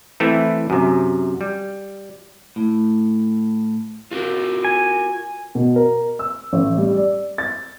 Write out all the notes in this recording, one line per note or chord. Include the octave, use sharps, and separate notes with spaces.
E3 A3 C4 E4
F#2 C3
G3
A2
F4 F#4 A#4
G#5
B2
A#4
E6
A1
G3
D5
A6